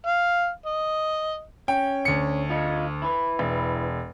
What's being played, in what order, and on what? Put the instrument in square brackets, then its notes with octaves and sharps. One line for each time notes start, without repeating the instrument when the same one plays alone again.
[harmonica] F5
D#5
[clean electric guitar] C#4 [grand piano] G5
[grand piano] D2 C#7
[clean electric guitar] F4 D#5
E4 B4
[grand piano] E1